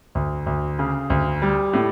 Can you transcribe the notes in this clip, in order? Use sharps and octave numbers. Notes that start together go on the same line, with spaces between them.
D2
D2
C#3
D2
G3
A2